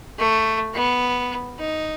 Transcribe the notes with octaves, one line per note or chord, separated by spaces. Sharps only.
A3
B3
D#4